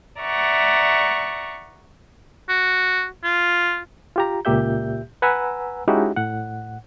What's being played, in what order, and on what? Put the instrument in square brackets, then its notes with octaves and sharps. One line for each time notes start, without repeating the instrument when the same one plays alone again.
[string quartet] D5 E5 F#5 A#5 C#6
[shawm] F#4
F4
[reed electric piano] F4 G4 A#5
C#2 A#2 A#3 G4 E5 G6
B4 F#5 G#5 A#5 B5 E6
G#3 C#4 D#4 E4 F#4 G4
A2 F#5